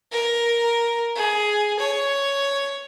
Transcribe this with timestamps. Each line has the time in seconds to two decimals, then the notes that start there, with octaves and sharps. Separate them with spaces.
0.12 A#4
1.16 G#4
1.79 C#5